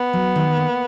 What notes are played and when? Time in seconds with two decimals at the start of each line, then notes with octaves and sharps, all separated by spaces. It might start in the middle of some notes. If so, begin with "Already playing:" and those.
Already playing: B3
0.13 F#3
0.36 D#3
0.57 A#3